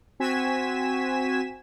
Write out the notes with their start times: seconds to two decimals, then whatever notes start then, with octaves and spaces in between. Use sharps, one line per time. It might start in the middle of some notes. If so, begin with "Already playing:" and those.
0.20 C4 F#4 G#5 G#6 B6 E7